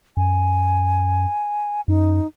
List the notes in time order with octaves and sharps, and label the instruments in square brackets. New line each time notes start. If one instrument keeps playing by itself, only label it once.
[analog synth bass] F#2 [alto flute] G#5
[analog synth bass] F#2 [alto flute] D#4